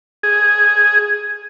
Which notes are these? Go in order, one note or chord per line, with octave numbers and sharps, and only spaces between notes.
G#4